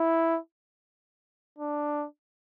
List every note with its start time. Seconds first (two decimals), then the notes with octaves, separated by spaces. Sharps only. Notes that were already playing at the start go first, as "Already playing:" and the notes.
Already playing: E4
1.59 D4